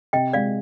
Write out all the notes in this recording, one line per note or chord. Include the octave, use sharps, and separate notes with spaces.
C3 D#5 G5
G#3 D5 F5